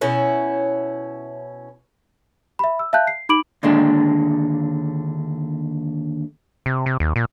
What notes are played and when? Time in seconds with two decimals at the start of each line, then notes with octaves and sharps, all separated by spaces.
0.01 B2 C#4 E4
2.59 E5 B5
2.79 E6
2.93 E5 F5 A5 F#6 G6
3.07 C7
3.29 D#4 B5 D6 D7 F#7
3.63 D#2 A#2 D3 G#3 D4
6.66 C3
6.86 C3
7.00 D#2
7.16 A#2